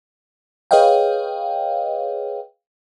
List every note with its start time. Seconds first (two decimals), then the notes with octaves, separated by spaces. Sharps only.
0.71 G#4 B4 C#5 D#5 F5 G5